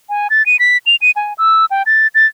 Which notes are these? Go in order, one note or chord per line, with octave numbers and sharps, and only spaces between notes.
G#5
A6
D#7
B6
F7
D#7
G#5
E6
G5
A6
A6